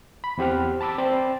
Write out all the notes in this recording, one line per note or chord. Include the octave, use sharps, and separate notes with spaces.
B5
E2 C4 G4 F#5 F6
A5 B5 D6 E6 A6
C4 C5 D5 G5 A6